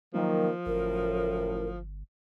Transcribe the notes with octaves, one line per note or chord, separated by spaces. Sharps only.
D#3 F3 F#3 A#3
G1 F#2 A2 A#4